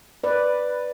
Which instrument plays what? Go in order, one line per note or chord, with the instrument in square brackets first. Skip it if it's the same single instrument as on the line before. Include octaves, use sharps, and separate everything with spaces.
[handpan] B4 D5